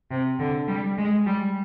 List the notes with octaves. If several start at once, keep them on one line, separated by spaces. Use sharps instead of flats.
C3
D3
G3
G#3
G3